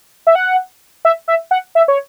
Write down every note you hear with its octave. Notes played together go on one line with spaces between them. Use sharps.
E5
F#5
E5
E5
F#5
E5
C#5